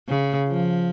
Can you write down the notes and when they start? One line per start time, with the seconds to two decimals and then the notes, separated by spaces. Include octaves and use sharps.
0.09 C#3
0.48 F3